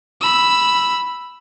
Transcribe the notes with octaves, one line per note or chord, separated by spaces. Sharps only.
B5 E6